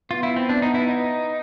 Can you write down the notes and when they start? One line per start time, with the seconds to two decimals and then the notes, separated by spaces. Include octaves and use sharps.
0.11 B3 F4
0.23 E4
0.36 C4
0.49 D4
0.62 D#4
0.74 E4
0.88 D#4